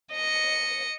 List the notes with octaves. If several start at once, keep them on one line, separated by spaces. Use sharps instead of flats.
D#5 C#7